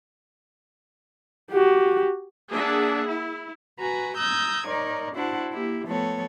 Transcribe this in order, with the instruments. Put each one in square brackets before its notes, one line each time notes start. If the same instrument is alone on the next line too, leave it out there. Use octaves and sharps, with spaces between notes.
[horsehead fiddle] F#4 G4
[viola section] A#3 D4 G#4 E5 F#5
E4
[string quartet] F#4 B4 G#5 A#5
A#5 D#6 E6 G6 G#6
D#4 A#4 C#5 D5
D4 E4 F#4 C5 F#5 A5
A#3 E4 G4
F3 A3 B3 A4 C#5